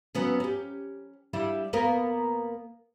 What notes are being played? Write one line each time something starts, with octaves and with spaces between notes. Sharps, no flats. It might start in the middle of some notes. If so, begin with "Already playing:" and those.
F#3 B3 C#4
C#4 G4
G3 D4 E4
A#3 B3 A#4